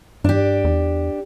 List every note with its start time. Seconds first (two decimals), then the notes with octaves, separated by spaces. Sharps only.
0.24 G2 D4 G4
0.65 E2